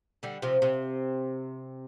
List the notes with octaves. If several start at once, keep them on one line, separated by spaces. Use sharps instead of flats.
D3 G3
C3 F3
C3